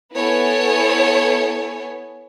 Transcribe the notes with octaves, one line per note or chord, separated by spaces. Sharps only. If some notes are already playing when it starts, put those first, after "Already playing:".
B3 E4 A4 C#5 G#5